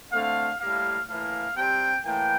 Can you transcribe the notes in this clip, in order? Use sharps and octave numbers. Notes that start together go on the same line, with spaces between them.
D3 A3 C4 F5
A2 G3 A#3 F5
A2 E3 A#3 F5
C3 G3 C4 G5
A2 E3 A#3 G5